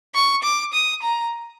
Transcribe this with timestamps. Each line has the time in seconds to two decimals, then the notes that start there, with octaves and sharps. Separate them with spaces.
0.15 C#6
0.43 D6
0.73 D#6
1.03 A#5